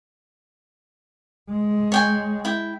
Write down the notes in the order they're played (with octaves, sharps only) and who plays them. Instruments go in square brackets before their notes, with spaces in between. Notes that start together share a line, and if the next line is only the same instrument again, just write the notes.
[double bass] G#3
[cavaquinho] C#5 G5 G#5
E4 G5